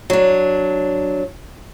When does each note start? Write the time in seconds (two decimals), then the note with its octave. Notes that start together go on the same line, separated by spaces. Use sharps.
0.10 F#3 D4